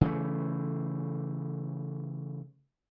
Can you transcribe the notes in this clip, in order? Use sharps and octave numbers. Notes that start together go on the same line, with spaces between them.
C#3 E3 A3